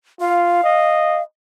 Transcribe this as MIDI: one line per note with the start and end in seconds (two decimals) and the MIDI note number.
0.20 0.59 65
0.20 1.22 77
0.64 1.22 75